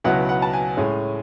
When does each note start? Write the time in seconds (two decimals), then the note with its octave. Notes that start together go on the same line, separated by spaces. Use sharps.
0.04 C#2 B2 F#3 B3 E4 F#5
0.29 F#5
0.42 A5
0.53 G#5
0.77 A2 G#3 C#4